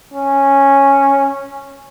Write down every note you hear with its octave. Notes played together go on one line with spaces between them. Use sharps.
C#4